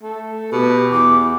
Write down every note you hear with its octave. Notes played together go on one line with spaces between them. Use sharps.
A3
B2 G4
E2 D6